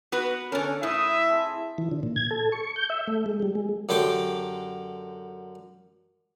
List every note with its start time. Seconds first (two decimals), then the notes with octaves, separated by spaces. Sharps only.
0.12 B3 F#4 B4
0.52 D3 C#4 A4 A#4 G#5
0.83 A2 E4 E5 D#6
1.29 C4 G#4 A5
1.78 E3
1.92 D3
2.03 A#2
2.16 G#6
2.31 A4
2.52 C#6
2.76 G6
2.90 E5
3.08 A3
3.26 G#3
3.42 G3
3.55 G#3
3.89 F#2 D3 G4 C6 D6